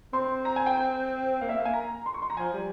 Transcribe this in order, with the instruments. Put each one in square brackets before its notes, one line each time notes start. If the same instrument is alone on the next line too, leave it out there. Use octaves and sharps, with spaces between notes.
[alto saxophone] C4 [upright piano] C6
[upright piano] A#5
G#5
G5
[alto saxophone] A#3 [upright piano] F5
[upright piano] E5
[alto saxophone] A#3 [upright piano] F5
[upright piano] G#5
A#5
C6
C#6
C6
A#5
[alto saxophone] F3 [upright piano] G#5
[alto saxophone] G3